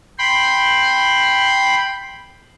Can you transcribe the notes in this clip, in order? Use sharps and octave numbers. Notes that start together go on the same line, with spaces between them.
G5 B5 C6